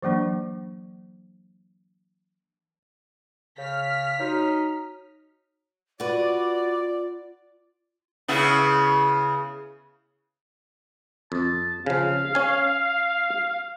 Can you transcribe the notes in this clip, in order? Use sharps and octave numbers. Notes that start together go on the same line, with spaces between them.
E3 F#3 A#3 D4
C#3 C#5 F6 B6
D#4 F#4 C#5
F4 F#4 B4 D5
C#3 B3 E4
F2 A5
C#3 F3 F5
C#4 G#5